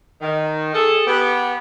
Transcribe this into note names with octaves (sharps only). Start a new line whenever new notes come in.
D#3
G#4 A4
B3 G4